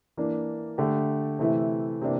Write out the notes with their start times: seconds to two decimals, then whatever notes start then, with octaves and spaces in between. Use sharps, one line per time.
0.17 E3 A#3 D4
0.78 D3 A3 D4 G4
1.39 C3 E3 A3 E4
2.01 C3 E3 A#3 D4